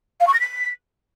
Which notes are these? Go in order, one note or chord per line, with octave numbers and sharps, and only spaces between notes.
F5
C#6
A#6
B6